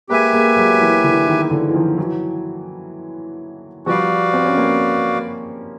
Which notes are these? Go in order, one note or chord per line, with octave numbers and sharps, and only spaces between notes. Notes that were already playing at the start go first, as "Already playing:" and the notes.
G#3 A#3 G4 B4 E5 G#5
G#3 A#3
F#3 G#3
E3 F#3
D3 E3
D#3
D3 E3
E3
D#3 F3
E3 F#3
F3 G3 F#4 B4 D5 F5
C4
C#4
A#3 C4